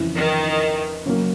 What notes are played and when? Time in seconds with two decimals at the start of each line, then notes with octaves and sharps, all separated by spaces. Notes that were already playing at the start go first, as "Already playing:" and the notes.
Already playing: F2 C#3 E3
0.16 D#3
1.06 C#3 F#3 A#3